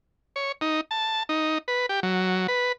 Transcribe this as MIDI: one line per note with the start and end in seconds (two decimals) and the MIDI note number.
0.36 0.52 73
0.61 0.81 63
0.91 1.23 81
1.29 1.58 63
1.68 1.86 71
1.89 2.00 67
2.03 2.47 54
2.48 2.72 71